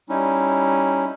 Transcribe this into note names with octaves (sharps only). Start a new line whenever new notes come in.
G3 C#4 D#4 E4